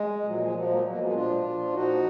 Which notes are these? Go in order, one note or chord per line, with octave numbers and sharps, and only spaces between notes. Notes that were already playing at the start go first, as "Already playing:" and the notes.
Already playing: G#3
A#2 F3 F#3
F3 G#3
A#2 F3 F#3
F#3 A#3
B2 F#3 A#3
F3 G#3
A#2 F3 D4 F4
A#2 F3
A#2 F3 D#4 F#4